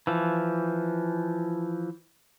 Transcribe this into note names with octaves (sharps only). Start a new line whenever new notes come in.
E3 F3